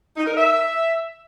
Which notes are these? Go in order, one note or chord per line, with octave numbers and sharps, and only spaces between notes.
D#4
A#4
E5